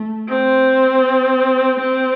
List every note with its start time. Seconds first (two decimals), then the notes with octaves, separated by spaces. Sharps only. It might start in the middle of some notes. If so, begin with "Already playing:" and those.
Already playing: A3
0.29 C4
1.80 C4